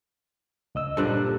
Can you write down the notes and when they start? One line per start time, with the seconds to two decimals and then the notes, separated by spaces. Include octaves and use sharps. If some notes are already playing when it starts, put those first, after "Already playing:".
0.75 C#2 D#5 E6
0.97 G2 A#2 D3 A4 C5 F#6